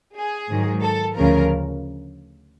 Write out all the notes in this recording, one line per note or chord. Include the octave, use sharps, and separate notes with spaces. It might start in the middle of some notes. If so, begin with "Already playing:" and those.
G#4
G#2 D#3 F#3
A4
D2 C#3 F3 A#4